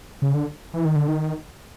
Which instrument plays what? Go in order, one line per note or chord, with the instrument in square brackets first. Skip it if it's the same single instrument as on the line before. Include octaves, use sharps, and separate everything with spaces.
[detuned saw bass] C#3
D3
E3
D#3
D3
D#3